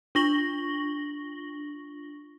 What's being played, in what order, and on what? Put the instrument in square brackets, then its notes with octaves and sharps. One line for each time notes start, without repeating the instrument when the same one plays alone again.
[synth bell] D4 F4 C#6 A#6 F#7 G7